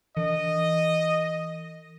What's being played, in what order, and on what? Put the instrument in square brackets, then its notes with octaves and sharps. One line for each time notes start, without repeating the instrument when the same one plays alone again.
[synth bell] E3 [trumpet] D#5